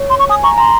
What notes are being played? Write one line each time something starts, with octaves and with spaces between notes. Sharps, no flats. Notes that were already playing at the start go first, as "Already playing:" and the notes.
Already playing: C#5
C6
C#6
G#5 D#6
A#5 C#6
A#5 C6